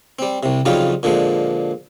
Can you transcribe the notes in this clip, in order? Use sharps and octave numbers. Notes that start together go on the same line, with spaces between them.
G3 C4
C2 C3
F2 C#3 F#3 G3 D#4 F4
A#2 D3 F3 G#3